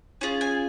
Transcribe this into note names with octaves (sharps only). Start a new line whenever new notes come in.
C#4 F4 G#4
G#5